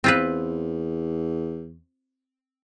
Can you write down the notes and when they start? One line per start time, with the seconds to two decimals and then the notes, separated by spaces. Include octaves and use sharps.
0.04 E2 C4 F4 B4